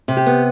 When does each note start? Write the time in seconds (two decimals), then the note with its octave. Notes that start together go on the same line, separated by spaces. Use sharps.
0.08 C3
0.17 G4
0.26 B3